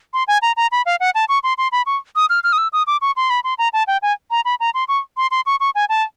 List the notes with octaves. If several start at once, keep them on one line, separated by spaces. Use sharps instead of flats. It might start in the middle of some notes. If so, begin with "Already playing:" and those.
C6
G#5
A#5
A#5
B5
F5
F#5
A5
C#6
C6
C6
B5
C#6
D#6
F6
F6
D#6
E6
D#6
D6
C#6
C6
B5
C6
A#5
A5
G5
G#5
A#5
B5
A#5
C6
C#6
C6
C6
C#6
C#6
G#5
A5